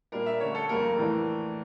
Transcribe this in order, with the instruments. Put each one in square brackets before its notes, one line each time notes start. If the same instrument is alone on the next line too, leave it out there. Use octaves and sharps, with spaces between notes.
[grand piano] A#2 G3 A#3 D4 A#4
E5
D3 A3 C#4 C#5
A4
F2 C#3 G3 A#3 A#4
A2 E3 A3 D4